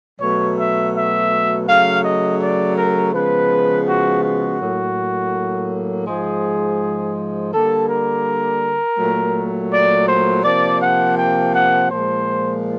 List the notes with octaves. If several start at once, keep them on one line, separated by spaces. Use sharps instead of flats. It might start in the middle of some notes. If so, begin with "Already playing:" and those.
B2 F#3 A3 C#5
E5
E5
C#3 F#3 A3 F5
D#5
D5
A#4
C#3 F3 G#3 B3 B4
F#4
F#4
A2 F#3 A#3
G#2 F3 G#3 G#4
D3 G3 A#3 A4
A#4
A#2 F#3 A3
D5
C5
C3 F3 A#3 D5
F#5
G5
F#5
A#2 F3 G#3 C5